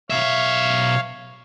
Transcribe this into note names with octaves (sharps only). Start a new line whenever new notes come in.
B1 C#5 E5 F5